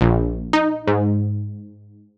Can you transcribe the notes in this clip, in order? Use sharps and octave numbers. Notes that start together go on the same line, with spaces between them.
A#1
D#4
G#2